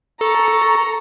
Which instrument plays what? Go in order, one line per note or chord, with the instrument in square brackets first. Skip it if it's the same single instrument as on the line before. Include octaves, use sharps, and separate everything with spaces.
[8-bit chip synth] A4 [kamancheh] A#5 [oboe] C#6